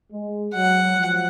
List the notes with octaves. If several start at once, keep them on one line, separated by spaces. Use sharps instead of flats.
G#3
F#3 F#5
F3